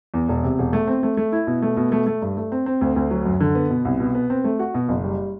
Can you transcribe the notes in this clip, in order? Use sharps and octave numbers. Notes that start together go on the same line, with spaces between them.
E2
E1
C3
E1
A3
C4
A3
A3
E4
B2
A3
B2
A3
A3
G2
A3
C4
C4
D2
D2
F#3
F#2
D3
B3
B2
C2
B2
B3
C4
A3
F#4
B2
F#1
G3